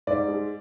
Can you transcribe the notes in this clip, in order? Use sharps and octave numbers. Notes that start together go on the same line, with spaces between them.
G#2 D5
G#3